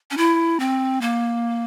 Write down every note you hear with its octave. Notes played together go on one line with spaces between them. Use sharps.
C#4
E4
C4
A#3